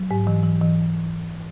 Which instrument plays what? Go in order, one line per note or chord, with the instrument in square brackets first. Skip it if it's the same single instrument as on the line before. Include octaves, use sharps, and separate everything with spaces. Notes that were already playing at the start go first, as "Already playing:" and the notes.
Already playing: [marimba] F#3
G#2
E3
E3
E3